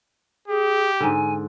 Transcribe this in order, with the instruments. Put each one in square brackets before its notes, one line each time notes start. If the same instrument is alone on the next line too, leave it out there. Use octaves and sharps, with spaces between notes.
[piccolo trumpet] G4 [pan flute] G#4
[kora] G#2 D3 [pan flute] G#5